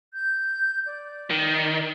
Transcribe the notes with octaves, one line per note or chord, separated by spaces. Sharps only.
G6
D5
D#3